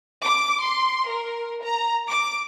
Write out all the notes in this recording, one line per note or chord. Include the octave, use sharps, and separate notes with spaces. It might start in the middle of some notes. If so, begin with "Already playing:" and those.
D6
C6
A#4
A#5
D6